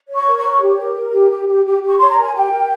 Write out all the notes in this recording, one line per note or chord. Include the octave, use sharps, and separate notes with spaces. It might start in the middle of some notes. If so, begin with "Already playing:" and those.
C#5
C#6
A#4
C#6
C#5
G4
A#4
A#4
G4
G4
G4
G4
G4 C#6
C#5 C6
A#5
A#4 G#5
G4 G5
A#4